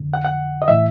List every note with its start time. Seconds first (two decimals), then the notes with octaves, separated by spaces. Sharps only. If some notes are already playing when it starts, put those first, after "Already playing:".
Already playing: F2 D3
0.14 F#5
0.25 F#5
0.62 D#5
0.68 A2 E3 E5